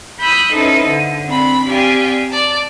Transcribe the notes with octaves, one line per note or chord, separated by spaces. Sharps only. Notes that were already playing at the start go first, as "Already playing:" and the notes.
B5 D#6 E6 F#6 G6
C#4 D#4 E4 A4 B4 C5
D3
C4 D4 B5
C4 G4 D5 F5 G5 G#5
D5 A5